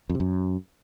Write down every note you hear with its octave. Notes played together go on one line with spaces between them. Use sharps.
F2
C3
F#2